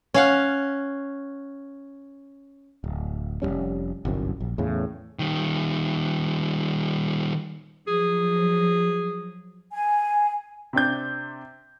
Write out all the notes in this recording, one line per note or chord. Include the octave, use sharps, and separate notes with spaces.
C#4 F5 F#5
D1
F1 D#2 G3 C#4
G1 C2 F#2
A#1
E2 A2 C#3
D#3 G3
F3 F#3 G#4
G#5
C3 C4 D4 G6